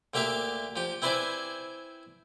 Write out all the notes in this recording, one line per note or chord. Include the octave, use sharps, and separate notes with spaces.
D2 A#3 G4 E5 F5 D6
F3 G4
C4 E4 B4 C5 D5 G#5